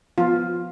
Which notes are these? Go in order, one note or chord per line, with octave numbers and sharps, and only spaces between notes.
F3 B3 F4